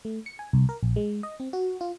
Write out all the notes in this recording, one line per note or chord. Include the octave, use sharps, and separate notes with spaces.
A3
C#7
G#5
C2
A#4
A#1
G#3
D#5
C4
F#4
F4